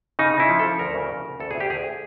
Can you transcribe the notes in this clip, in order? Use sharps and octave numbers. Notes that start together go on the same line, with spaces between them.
C#3 D#4
C#3
E4
F3
F3 A4
D2 A#4
C#3
C#3
C#3
D2 A4
D2 G#4
G4
D2 G#4